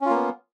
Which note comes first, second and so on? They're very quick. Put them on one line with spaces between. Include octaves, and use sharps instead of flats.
C#4 F4 A#3 B3